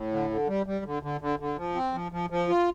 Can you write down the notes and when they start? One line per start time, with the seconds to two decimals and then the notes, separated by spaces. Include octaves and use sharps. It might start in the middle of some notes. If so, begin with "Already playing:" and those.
Already playing: A2
0.12 D3
0.30 D3
0.48 G3
0.66 G3
0.85 D3
1.03 D3
1.21 D3
1.39 D3
1.57 F3
1.75 C4
1.94 F3
2.12 F3
2.30 F3
2.48 F4